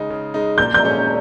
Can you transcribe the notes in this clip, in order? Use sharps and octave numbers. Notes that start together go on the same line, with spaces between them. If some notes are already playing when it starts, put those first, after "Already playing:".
Already playing: C#3 G#3 D#4
C#3
G#3 D#4
A#2 G6
G6
G#3 C#4